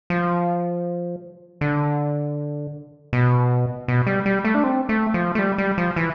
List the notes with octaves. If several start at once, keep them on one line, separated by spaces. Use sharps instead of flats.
F3
D3
B2
B2
G3
G3
A3
D4
C4
A3
F3
A3
G3
G3
F3
E3